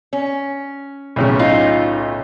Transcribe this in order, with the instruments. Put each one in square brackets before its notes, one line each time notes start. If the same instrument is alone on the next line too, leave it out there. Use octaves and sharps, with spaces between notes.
[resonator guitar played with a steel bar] C#4
[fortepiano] B1 A2 C#3
[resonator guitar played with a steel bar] D#4 F4